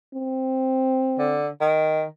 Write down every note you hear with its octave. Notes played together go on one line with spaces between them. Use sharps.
C4
D3
D#3